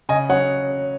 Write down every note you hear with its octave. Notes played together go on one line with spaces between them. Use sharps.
C#3 D#5 G#5
F#3 C#4 C#5 F#5